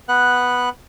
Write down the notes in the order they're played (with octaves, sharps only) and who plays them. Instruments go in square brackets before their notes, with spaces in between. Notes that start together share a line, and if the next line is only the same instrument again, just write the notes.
[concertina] B3 B4 F#5 F#6